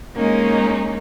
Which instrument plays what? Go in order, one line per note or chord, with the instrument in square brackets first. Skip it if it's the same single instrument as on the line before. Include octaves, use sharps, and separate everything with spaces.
[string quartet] G#3 A#3 C#4 D#4